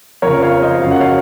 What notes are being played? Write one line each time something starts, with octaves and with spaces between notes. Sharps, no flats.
F2 C#3 A#4 C#5
C#5 F5
C5 D#5
F#2 C#3 F5
F#5
C#5 F5